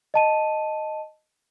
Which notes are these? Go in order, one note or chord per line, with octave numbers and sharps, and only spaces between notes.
D#5 A5 D#7